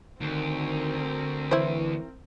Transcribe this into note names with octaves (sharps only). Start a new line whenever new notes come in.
D2 D#3 C4 A#4
E3 E4 C5